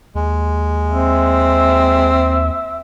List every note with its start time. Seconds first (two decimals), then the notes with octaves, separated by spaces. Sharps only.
0.15 D#2 G#3
0.91 C4 E5